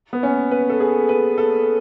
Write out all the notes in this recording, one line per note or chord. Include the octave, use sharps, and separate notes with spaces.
B3
C#4
B4
A4
G#4
B4
A4